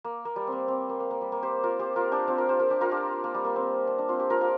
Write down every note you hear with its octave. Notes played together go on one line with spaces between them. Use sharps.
A#3
A#3
G3
A#3 C4
C4
A#3
A#3
A#3
G3
A#3
G4 C5
F4 A#4
G4 C5
F4 A#4
D4 G4
C4 F4
F4 A#4
G4 C5
F4 A#4
D4 G4
F4 A#4
D4 G4
A#3
G3
A#3
C4
D4
D4
C4 F4
D4 G4
F4 A#4
F4 A#4